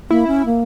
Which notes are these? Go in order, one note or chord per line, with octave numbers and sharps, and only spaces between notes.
A#3 E4
C#4
A#3